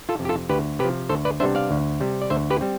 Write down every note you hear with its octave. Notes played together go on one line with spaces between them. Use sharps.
F4 A4
F2 C3
G4
F4 A4
D2 G4 B4
C3 G4 B4
F3
D2 A4 C5
B4 D5
C3 G3 B3 D4 C5 E5
D5 F5
D2
C3 G3
D5
D2 C5 E5
G4 B4
G3 C4